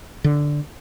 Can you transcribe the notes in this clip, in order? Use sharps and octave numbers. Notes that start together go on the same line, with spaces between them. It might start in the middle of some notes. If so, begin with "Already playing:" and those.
D3